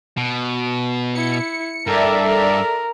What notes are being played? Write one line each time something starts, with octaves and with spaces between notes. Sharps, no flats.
B2
E4 C#7
G2 A4 A#4 D5 E5
A#4